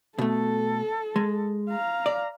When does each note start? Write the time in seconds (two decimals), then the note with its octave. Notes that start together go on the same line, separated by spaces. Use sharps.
0.18 B2 A3 A4
1.16 G#3
1.70 F5 A#5
2.06 D5